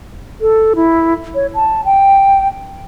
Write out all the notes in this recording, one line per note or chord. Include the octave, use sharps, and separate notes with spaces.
A4
E4
C#5
A5
G5